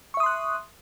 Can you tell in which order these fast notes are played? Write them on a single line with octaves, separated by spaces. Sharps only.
C#6 E5 D#6 C6 F#6